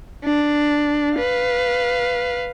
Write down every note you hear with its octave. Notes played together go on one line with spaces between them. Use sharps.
D4
B4 F5